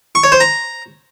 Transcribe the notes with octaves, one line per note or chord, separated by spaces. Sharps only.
C#6
C#5
C5
A#5